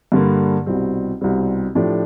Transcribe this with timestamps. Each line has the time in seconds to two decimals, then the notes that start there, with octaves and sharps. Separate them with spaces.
0.12 G2 D3 G3 A#3
0.66 C2 B2 G3 C4
1.21 C2 B2 G3 C4
1.75 A2 F3 A3 D4 G4